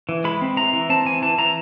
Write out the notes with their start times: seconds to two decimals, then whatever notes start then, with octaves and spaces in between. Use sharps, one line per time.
0.09 E3
0.24 G#3 B5
0.41 C4
0.57 E3 A#5
0.73 E3
0.89 C4 A5
1.05 E3 G#5
1.22 E3 A5
1.38 E3 A#5